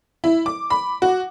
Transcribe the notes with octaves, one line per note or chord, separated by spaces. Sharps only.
E4
D6
B5
F#4